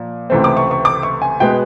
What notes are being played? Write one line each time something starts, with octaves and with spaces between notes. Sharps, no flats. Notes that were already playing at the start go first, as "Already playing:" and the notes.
Already playing: A#2 F3
C#2 C3 E3 A3 C4
D6
C#6
C#6
D6
C#6
G#5
B2 G#3 B3 G5